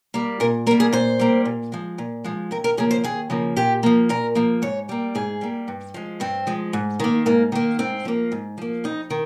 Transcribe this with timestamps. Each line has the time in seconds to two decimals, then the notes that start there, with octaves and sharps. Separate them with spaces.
0.14 G3 A#3
0.40 A#2 A#4
0.67 A#3 A#4
0.71 G3
0.80 G#4
0.93 A#2 C5
1.19 G3 A#3
1.45 A#2
1.72 F3 G#3
1.98 A#2
2.24 F3 G#3
2.51 D#2 A#4
2.64 A#4
2.77 C#3 F3 A#3 G#4
2.91 C5
3.04 D#2 G#4
3.30 C#3 F3 A#3
3.56 A#2 G4
3.83 F3 A#3
4.09 A#2 A#4
4.35 F3 A#3
4.62 G#2 C#5
4.89 G3 A#3
5.15 G#2 G#4
5.41 G3 A#3
5.68 G2
5.94 F3 G#3
6.20 G2 C4
6.47 F3 G#3
6.73 G#2
7.00 D#3 A#3
7.26 G#2 A#3
7.52 D#3 A#3
7.79 G#2 C4
8.05 F3 A#3
8.32 G#2
8.58 F3 A#3
8.84 F2 D#4
9.10 D#3